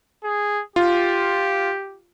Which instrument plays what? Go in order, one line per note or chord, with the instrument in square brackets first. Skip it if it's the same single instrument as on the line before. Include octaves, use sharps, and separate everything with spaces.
[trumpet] G#4
[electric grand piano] F4 [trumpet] G4